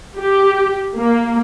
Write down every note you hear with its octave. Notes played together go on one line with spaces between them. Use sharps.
G4
A#3